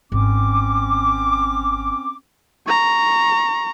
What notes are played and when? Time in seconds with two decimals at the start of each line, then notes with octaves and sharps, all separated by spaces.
0.12 G#1 C4 C#4 D6
2.67 A#5 C#6